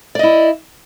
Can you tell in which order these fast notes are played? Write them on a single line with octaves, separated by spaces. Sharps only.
D5 D#5 E4